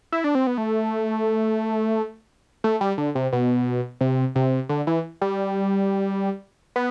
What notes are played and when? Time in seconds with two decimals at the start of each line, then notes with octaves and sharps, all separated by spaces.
0.12 E4
0.24 D4
0.35 C4
0.47 B3
0.58 A3
2.64 A3
2.81 G3
2.98 D3
3.15 C3
3.33 B2
4.01 C3
4.35 C3
4.69 D3
4.87 E3
5.21 G3
6.76 B3